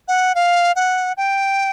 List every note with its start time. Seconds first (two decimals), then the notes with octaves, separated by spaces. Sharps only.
0.08 F#5
0.35 F5
0.76 F#5
1.17 G5